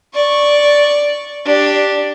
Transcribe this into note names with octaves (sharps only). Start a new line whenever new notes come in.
D5 C#6
D4 G4